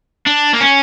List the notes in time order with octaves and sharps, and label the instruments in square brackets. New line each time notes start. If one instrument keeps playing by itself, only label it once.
[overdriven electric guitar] D4
A#3
C#4